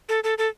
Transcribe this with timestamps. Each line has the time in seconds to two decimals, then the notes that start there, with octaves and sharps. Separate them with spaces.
0.09 A4
0.24 A4
0.38 A4